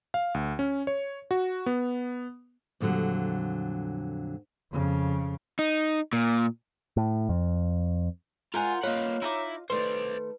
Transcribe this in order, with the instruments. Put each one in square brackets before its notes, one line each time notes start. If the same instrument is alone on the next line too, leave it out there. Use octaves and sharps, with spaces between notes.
[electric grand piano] F5
D2
C#4
C#5
F#4
B3
[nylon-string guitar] F2 A#2 D3 E3 F#3 G3
[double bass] F2 C#3
[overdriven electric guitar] D#4
A#2
[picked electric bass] A2
F2
[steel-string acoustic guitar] G#3 G#5 [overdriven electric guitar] F4 [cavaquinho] A#4 C5 F#5
[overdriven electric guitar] A#3 F#5 [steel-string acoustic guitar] F4 D#5 [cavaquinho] B4 [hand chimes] C#5
[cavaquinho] D#4 A#5 D6 [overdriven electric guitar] E4 E5
[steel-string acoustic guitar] D#3 A3 [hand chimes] B4 [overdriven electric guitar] C5 D5 [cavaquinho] C6